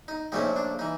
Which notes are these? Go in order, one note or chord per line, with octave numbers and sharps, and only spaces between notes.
D#4
A#1 A#2 F3 A3 C#4 D#4
D4
E3 D#4